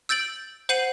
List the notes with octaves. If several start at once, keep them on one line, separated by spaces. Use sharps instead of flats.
E6 G6 A6 D7 F#7
C5 F#5 G6 C7 D#7 F#7